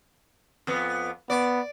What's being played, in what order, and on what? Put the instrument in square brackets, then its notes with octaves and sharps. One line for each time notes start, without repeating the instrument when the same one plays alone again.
[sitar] F2 B3
[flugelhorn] B3 [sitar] D5